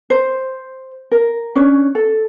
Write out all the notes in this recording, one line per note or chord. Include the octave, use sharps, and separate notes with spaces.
C5
A#4
C#4 D4 C#5
A4